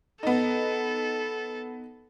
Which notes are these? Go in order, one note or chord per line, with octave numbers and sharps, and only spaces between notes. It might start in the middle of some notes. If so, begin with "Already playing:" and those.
B3 D#4 A4